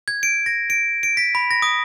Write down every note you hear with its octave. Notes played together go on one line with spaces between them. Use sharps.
G#6
D7
A#6
D7
D7
B6
B5
A#6
D#6